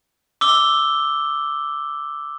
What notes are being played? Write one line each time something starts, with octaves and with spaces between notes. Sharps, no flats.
D6 E6 G7